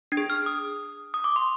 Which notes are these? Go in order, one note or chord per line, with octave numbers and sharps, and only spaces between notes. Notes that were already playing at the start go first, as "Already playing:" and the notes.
D4 G#6
G#4
F6
D#6
D#6
D6
C6